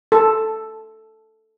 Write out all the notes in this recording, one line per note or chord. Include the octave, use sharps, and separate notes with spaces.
A4